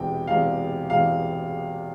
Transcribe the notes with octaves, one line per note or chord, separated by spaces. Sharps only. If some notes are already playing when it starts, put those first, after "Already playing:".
Already playing: E1 E2 C3 E3 G#3 G5
E1 E2 C3 E3 G#3 F5
E1 E2 C3 E3 G#3 F5